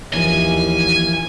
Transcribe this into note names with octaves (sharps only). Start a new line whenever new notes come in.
D#2 E3 F3 G#5